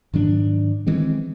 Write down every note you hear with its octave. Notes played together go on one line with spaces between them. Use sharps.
G#2 D#3 F#3 D4
D#3 E3 G#3 C4